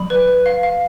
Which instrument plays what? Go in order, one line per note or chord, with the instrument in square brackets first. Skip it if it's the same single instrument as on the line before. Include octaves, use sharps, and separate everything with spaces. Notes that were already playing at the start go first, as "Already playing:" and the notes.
Already playing: [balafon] F#3 [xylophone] B5
[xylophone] B4
B4
F5
F5